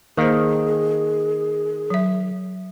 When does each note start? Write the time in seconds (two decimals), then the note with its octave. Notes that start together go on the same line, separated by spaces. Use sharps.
0.17 D#3 A#3 G#4 C5
1.90 F#3 E5